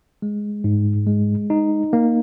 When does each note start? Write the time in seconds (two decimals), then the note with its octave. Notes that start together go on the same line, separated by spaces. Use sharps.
0.22 G#3
0.64 G#2
1.07 G#3
1.50 D#4
1.93 A#3